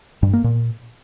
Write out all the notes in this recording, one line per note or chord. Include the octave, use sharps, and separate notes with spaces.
G2
A#3
A#2